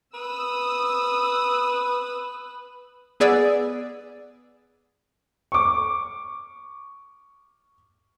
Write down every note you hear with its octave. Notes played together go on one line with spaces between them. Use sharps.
B4 D#6 E6
B3 G#4 D5 E6
C#6 D6